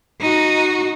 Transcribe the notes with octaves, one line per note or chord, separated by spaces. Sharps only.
D#4 F#4